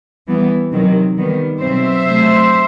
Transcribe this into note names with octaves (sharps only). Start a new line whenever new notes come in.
E3 G3 B3
C3 D#3 F#3
D#3 G3 B3
B2 F#3 C4 C5 E5
C3 F#3 A3